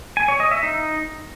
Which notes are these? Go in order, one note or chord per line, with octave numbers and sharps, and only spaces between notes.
G#5
C#5
D#5
E5
D#4